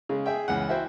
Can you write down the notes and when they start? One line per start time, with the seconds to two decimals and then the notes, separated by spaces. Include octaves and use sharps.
0.09 C#3 G#3
0.26 G#4 E5 G5
0.48 C#2 E3 F#5
0.69 E4 F#4 C5 G5